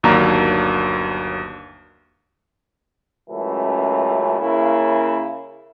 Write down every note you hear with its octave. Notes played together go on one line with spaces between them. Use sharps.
G1 D#2 F#3 A#3 D4 A#5
C#2 F#2 E3 A3
C#3 A#3 C#4 E4